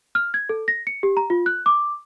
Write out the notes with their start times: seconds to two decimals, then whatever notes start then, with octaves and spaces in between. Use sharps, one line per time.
0.15 F6
0.34 G#6
0.49 A4
0.68 A#6
0.87 C#7
1.03 G4
1.17 A#5
1.30 F4
1.46 F#6
1.66 D6